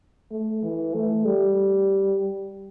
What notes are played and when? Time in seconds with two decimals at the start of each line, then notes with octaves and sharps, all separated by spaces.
0.31 A3
0.63 E3
0.94 A3
1.25 G3